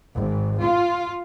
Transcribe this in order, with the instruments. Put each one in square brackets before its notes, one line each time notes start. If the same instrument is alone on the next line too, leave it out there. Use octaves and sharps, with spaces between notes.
[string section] G#1
F4